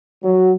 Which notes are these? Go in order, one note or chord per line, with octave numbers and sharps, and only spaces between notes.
F#3